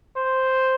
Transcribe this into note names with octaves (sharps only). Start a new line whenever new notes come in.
C5